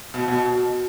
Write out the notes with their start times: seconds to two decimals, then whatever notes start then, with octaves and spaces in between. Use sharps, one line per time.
0.14 B2
0.28 B2